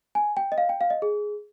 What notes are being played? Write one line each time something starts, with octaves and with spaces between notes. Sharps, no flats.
G#5
G5
D#5
F5
G5
F5
D#5
G#4